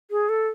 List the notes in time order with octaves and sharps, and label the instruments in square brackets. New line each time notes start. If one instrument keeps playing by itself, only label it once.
[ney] G#4
A4